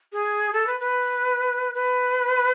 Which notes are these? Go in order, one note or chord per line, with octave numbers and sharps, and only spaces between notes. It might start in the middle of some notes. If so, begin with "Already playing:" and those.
G#4
A4
B4
B4
B4